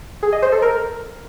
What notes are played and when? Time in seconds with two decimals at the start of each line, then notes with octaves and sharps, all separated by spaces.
0.23 G#4
0.33 D#5
0.42 C5
0.52 A4
0.62 A#4